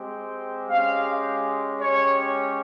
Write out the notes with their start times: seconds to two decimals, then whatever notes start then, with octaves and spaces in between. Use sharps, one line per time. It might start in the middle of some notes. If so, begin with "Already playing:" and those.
Already playing: G#3 C4 G4
0.69 G#3 C#4 G4 F5
1.80 G#3 C#4 G4 C#5